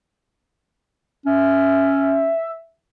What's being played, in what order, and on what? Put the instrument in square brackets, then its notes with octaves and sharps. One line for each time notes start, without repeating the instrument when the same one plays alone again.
[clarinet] C#4 [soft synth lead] E5